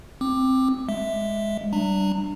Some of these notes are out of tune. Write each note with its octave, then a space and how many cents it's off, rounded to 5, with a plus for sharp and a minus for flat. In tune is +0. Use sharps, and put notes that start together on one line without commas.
C4 +0 D6 +15
G#3 +0 E5 +0
G3 -25 D4 +5 A#5 -30